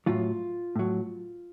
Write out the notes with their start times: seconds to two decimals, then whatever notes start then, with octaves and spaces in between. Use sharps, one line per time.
0.06 A2 F#3 F4
0.76 A2 F#3